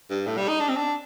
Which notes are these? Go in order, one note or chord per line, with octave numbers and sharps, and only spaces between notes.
G2
A2
G3
D#4
D4
C4
D4